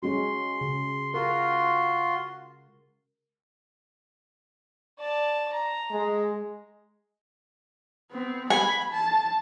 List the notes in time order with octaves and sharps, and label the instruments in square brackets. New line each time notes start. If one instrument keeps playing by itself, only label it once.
[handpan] G#3 C#4 F#4 [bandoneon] C6
[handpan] C#3
[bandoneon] F4 F#4 C6 [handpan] A#4
[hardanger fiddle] D5 A5
A#5
[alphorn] G#3
[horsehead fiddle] B3 C4
[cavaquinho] G#5 [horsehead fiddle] B5
[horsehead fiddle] A5